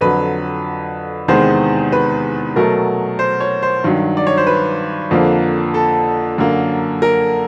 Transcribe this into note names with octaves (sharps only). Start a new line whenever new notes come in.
F2 D3 F#3 B4
E2 C3 D#3 G#3 B3 C5
B4
B2 F#3 A3 A#4
C5
C#5
C5
G2 D#3 F#3
D5
C#5
C5
B4
F2 D3 F3 A#3
A4
F#2 D3 F#3 A#3
A#4